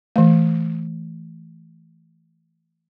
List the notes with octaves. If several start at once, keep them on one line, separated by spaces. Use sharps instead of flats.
E3 A3